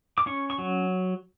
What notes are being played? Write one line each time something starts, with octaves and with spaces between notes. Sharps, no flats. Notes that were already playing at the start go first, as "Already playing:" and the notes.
D6
C#4 C#6
C#6
F#3